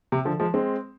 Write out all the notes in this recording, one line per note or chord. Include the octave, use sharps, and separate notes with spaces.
C3
D3 F3
F3 G#3
G#3 C4